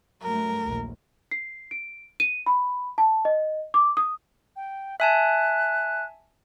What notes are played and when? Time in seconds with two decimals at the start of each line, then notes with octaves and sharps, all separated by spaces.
0.22 G2 F#3 A3 A#4
0.61 A#1 D#2
1.31 C7
1.71 D7
2.20 D#7
2.46 B5
2.98 A5
3.25 D#5
3.74 D6
3.97 D#6
4.56 G5
5.00 E5 G#5 A5 F#6